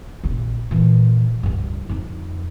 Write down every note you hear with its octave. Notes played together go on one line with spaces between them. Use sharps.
A#1 C3
A#2 E3
C#2 G2
F2 D#4